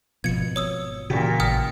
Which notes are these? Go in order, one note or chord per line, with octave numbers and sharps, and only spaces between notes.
G#1 B2 F3 G#6 C#7
C#5 D#6 E6
A#2 C#3 E3 F#4 G4
A1 G5 D#6 F6